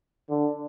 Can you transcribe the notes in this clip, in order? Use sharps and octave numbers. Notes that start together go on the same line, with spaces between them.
D3